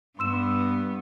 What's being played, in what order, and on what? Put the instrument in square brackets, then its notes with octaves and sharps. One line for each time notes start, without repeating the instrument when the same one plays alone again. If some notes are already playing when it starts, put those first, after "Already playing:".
[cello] G2 B3 [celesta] C6 E6 E7